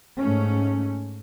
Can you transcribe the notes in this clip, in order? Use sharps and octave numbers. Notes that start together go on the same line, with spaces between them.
G#2 A3 C#4